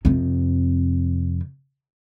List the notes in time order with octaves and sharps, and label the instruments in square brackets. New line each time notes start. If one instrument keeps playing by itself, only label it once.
[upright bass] F2 C3